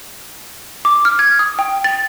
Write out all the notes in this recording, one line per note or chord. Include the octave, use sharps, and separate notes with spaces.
D6
F6
G#6
D#6
G5
A6